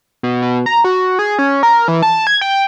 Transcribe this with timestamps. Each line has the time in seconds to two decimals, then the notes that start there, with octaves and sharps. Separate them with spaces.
0.23 B2
0.42 B2
0.66 A#5
0.84 F#4
1.19 G#4
1.39 C#4
1.63 A#4
1.88 E3
2.03 A5
2.27 G#6
2.41 G5